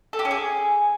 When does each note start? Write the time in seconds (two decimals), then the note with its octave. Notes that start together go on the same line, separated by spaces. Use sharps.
0.13 A4
0.19 G4
0.25 C#4
0.31 G#4